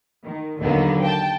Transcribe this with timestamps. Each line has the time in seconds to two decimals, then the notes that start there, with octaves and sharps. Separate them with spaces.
0.24 D#3
0.58 D#2 D3 F#3 A#3 B3
1.01 G5 A5